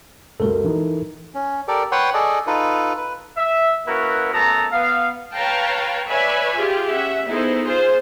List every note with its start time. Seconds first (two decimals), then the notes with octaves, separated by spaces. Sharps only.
0.40 C#2 F#2 A4 A#4
0.64 E3 D#4
1.35 C#4
1.68 G4 A4 A#4 D5
1.92 B4 C#5 F#5 G5 C6
2.14 G#4 A4 D5 D#5
2.47 D#4 F4 A4 B4
2.97 B4
3.38 E5
3.86 A#3 C#4 E4 F#4 A#4 B4
4.33 F#2 A3 B3 A5 A#5
4.72 B3 F5
5.35 B4 C#5 F5 G5 A5 A#5
6.08 B4 C#5 D5 E5 G#5 B5
6.58 F4 G4 G#4
6.92 C#4 E5 F#5
7.27 B3 D#4 E4 G#4 A4 C5
7.66 F4 G#4 C5